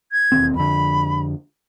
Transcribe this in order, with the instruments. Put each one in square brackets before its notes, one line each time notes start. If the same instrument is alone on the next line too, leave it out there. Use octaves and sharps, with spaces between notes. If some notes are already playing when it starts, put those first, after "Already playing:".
[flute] G#6
[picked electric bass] E1 D#2 C4
[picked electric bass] F2 D3 [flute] B5